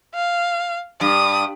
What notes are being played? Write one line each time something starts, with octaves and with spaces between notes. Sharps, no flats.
F5
G2 D#6